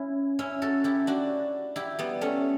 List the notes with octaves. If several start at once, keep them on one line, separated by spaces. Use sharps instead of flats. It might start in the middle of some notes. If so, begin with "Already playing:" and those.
Already playing: C#4 E4
C#4 E4
F#4 A4
E4 G4
D4 F#4
E4 G4
G3 B3
A3 C#4